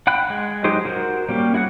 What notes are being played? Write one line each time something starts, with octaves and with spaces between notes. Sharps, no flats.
F#5 G5 B5 F#6
G#3
F#3 D#4 G4 G#4 C5
F#4 A#4 C5
G3 A#3 C#4 G4
E4 F#4 G#4 F#5